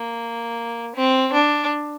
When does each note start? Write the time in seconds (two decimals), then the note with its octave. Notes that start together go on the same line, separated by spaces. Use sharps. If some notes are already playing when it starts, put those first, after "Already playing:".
Already playing: A#3
0.95 C4
1.33 D4